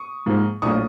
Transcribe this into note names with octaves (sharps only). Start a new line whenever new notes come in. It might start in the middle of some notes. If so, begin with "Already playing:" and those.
Already playing: C#6 D#6
G#2 F3 A#3
A#1 A2 F#3 A#3 C#6 D#6